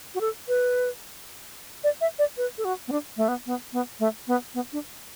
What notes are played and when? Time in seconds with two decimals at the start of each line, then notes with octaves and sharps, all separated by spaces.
0.15 F#4
0.21 A4
0.48 B4
1.84 D5
2.01 E5
2.19 D5
2.37 B4
2.58 A4
2.65 F#4
2.88 B3
2.92 D4
3.17 A3
3.28 B3
3.46 B3
3.73 B3
3.99 A3
4.27 B3
4.54 B3
4.73 D4